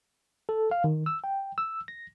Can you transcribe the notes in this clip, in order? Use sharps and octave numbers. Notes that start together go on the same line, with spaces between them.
A4
F5
D#3
E6
G5
E6
A#6